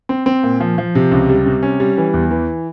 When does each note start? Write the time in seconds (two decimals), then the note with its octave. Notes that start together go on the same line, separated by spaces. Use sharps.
0.09 C4
0.26 C4
0.43 A#2
0.60 F3
0.78 F3
0.95 C3
1.11 C#2
1.29 G3
1.46 C3
1.63 C#4
1.80 G3
1.98 E3
2.14 E2
2.31 E3